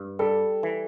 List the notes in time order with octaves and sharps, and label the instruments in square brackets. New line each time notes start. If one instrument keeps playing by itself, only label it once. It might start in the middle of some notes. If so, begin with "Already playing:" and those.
Already playing: [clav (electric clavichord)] G2
[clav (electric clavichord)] G3 [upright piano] A4
[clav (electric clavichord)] E3